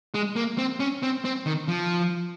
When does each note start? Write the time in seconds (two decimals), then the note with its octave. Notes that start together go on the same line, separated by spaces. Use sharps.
0.14 G#3
0.36 A#3
0.58 C4
0.80 C#4
1.03 C4
1.25 C4
1.46 D#3
1.68 F3